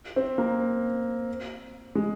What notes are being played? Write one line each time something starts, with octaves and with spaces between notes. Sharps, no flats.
C4
A#3
G#3